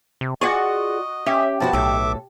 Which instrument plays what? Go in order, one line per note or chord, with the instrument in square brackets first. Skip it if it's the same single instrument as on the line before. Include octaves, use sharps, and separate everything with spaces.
[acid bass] C3
[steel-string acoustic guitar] F4 D5 F#5 [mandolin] F#4 C#6 [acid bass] G#4 [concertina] D#5
[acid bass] C#4 [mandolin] G4 [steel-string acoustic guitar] E5
[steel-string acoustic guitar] F#2 F3 F#4 [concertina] B3 A5
[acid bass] B1 [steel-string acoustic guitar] A2 A4 [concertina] E5 D6